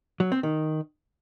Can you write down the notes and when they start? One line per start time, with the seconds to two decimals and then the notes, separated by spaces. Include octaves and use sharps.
0.20 F#3
0.32 C4
0.43 D#3